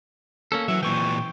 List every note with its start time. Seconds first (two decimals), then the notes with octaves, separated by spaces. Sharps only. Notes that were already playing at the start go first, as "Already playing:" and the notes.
0.52 A#3 C#4 A4
0.68 E3 F#3 E5
0.83 A#2 E3 G5 C#6